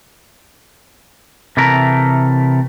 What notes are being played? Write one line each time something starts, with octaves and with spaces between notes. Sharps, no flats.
C3 E3 A3 A#4